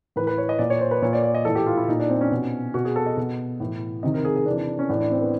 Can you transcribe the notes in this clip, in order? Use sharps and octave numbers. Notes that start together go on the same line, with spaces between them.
A2 E3 B4
B4
C#5
D#5
A#2 D5
C#5
C5
B4
A#2 C#5
D5
D5
D#5
A2 E3 A4
G4
F4
E4
A#2 D#4
D4
C4
C#4
B2
B2 F#4
G#4
A4
D#5
B2
A2 E3
C3 D#3 D#5
A#4
G#4
G#4
C3 E3 D4
D4
D4
C#4
A2 E3 D4
D4
C4
B3